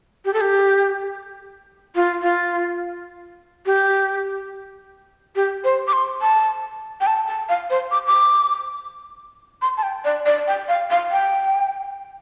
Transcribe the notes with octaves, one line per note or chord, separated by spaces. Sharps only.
G4
A4
G4
F4
F4
G4
G4
C5
D6
C6
A5
G5
A5
A5
F5
C5
D6
D6
C6
A5
G5
D5
D5
G5
F5
F5
G5